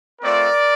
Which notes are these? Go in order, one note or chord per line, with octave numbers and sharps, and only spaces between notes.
A3 C4 F4 A#4 D5